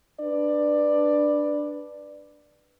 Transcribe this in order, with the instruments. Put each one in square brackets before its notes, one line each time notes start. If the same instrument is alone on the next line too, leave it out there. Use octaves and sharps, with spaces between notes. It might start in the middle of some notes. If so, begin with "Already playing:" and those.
[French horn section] D4 B4 D5